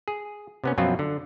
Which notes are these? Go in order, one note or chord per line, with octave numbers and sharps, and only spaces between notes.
G#4
C3 B3 C#4
F#2 B2 F3 F#3 C4 F4
D3